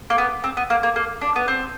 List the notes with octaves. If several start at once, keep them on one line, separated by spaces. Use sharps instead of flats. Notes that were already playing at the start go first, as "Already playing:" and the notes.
A#3
B3
C4
B3
A#3
A#3
A#3
D4
B3
C4